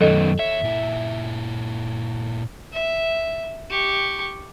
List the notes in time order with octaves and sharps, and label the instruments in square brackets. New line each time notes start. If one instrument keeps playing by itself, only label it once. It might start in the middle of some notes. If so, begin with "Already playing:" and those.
[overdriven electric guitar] F#2 D#3 [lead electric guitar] A3 B3 [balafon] A4 D#5
[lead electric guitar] D#2 C#5 [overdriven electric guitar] E5
[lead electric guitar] A#2 E4
[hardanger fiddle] E5
G4 C#6